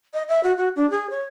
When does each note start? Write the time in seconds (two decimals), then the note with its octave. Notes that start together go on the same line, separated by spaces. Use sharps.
0.14 D#5
0.29 E5
0.43 F#4
0.57 F#4
0.76 D4
0.90 G#4
1.10 C#5